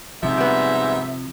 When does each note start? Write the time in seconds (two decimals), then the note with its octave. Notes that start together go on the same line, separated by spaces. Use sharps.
0.23 G#2 C3 F3 E5
0.37 G3 B3